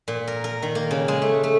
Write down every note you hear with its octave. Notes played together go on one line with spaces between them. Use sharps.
A#2
A#4
A#4
D#3
A#3
C#3
G#3
A3
A3